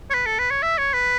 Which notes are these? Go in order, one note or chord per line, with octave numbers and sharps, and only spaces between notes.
C#5
B4
A4
B4
C#5
E5
C#5
B4